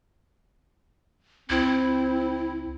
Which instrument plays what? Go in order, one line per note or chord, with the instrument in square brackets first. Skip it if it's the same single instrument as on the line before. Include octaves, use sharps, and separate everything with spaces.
[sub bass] C#2 [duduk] C4 [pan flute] E4